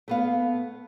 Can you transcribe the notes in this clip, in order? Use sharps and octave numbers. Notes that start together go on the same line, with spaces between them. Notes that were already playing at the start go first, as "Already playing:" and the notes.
A3 B3 F5